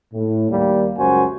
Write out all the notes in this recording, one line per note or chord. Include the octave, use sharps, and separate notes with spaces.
A2
D#2 G3 A#3
C#2 F#2 F#4 C5 G#5